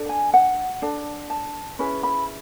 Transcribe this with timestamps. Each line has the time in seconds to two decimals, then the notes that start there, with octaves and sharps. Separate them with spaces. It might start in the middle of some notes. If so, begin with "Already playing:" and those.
Already playing: D4 A4
0.09 G#5
0.34 F#5
0.82 D4 A4
1.30 A5
1.79 C#4 E4 G#4 B4 B5
2.03 B5